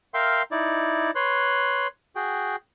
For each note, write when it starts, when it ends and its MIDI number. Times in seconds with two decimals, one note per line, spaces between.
0.14 0.42 70
0.14 0.42 76
0.14 0.42 77
0.14 0.42 79
0.14 0.42 84
0.51 1.11 63
0.51 1.11 64
0.51 1.11 74
1.15 1.87 71
1.15 1.87 73
1.15 1.87 84
1.15 1.87 90
2.16 2.56 66
2.16 2.56 68
2.16 2.56 79